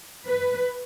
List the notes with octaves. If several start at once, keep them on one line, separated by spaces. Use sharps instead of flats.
B4